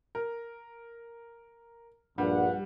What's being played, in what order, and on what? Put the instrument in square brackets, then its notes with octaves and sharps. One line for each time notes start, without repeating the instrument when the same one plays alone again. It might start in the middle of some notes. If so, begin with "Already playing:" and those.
[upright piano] A#4
[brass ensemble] A#1 G2 F#5 [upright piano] G3